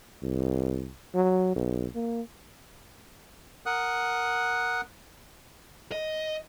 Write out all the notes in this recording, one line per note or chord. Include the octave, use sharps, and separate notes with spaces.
C2
F#3
B1
A#3
A#4 F#5 D#6 F#6
D#5